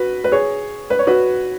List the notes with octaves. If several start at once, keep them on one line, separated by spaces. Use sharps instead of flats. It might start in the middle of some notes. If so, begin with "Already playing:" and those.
Already playing: F#4 B4
B4
G#4 C#5
B4
C#5
F#4 B4